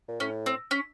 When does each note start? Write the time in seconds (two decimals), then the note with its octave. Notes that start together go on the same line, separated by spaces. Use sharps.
0.08 A#2
0.20 A2 C#4
0.46 C4
0.71 C#4